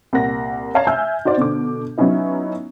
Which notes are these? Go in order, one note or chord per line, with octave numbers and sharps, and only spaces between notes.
C2 A#2 A#4 F#5 A#6
C#5 D5 F5 A5 A#5 G#6
E5 G#5 E6 F6 G6
D#4 F#4 C5 D5
B2 D3 D6
F#3 B3 C#4 D#4 E4